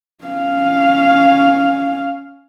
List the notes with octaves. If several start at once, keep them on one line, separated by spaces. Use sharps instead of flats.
C#4 F5